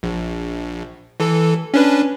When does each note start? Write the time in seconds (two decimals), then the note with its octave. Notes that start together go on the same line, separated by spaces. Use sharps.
0.03 A#1
1.20 E3 A4
1.74 C#4 D4 B4